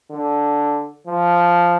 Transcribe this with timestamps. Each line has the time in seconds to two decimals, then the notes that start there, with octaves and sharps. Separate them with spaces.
0.11 D3
1.07 F3